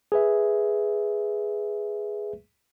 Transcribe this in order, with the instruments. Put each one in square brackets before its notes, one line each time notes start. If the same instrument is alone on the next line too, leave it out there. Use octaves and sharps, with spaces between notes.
[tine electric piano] G#4 B4 E5